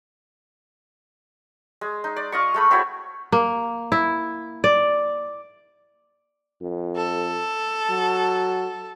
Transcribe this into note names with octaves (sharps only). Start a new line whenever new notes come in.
G#3
D#4
D5
F4 D#5 C#6
G#3 A3 B5
C4 E4 F#4 C#5
A#3
E4
D5
F2
A4
F#3